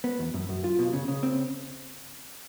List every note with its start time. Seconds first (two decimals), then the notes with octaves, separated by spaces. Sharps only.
0.04 B3
0.19 E2
0.34 F#2
0.49 F#2
0.64 F4
0.79 B2
0.93 C#3
1.08 C#3
1.23 C4